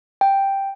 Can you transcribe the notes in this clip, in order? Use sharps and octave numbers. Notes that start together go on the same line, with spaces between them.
G5